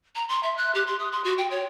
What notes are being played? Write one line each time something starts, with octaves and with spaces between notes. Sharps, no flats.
A#5
C6
E5
F#6
G4
C6
D#6
C6
F#4
G5
C#5